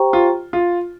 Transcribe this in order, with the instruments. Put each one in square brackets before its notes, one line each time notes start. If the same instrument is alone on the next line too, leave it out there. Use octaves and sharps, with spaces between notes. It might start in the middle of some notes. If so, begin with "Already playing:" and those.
Already playing: [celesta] G4 C5 G5 A#5 C#6
[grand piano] F4
F4